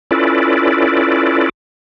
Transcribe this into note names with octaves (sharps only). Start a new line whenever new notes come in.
C#4 E4 F4 A4 B4 D5